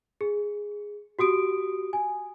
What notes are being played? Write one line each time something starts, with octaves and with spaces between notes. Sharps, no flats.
G#4
F#4 G4 D#6 D7
G#5